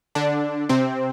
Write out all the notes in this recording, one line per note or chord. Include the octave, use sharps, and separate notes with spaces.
D3 D4
C3 C4